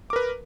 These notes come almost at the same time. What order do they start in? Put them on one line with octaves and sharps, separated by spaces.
D6 A#4 B4